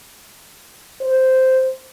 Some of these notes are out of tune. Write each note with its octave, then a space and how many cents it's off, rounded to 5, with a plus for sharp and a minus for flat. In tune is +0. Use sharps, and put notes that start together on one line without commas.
C5 -5